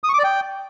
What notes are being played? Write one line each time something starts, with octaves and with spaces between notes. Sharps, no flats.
D#6
C#6
D6
D5
G5